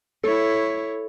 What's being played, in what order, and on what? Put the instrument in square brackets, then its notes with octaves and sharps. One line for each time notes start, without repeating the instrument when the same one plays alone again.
[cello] E4 C#5 [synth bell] A4